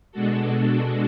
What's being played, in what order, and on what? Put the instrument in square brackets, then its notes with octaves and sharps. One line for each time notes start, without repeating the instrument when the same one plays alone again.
[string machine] B2 G#3 D4 F#4 A4